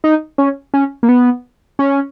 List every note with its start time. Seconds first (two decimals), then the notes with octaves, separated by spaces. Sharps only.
0.04 D#4
0.38 C#4
0.74 C#4
1.03 A#3
1.09 B3
1.79 C#4